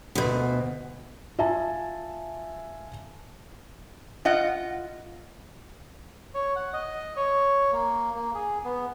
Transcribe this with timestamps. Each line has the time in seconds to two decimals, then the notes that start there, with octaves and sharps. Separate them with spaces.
0.15 D2 B2
1.39 F4 E5 G#5 A5
4.25 F4 D#5 F#5
6.35 C#5
6.56 F#5
6.73 D#5
7.17 C#5
7.72 A#3
8.15 A#3
8.35 G#4
8.65 B3